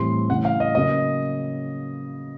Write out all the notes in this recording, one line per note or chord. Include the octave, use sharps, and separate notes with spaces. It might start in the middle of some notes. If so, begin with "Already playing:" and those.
Already playing: A2 E3 G3 C4 C6
C#3 E3 A3 F#5
F5
D#5
C#3 F#3 A#3 D#5